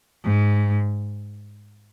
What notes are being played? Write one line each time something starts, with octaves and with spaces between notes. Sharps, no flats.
G#2